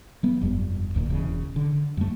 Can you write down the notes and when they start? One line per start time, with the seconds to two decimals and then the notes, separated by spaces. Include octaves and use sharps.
0.23 F#3 B3
0.41 F1 G2
0.94 D1 D2 A#2
1.09 E1 E2 C#3
1.56 D3
1.97 F#2 A3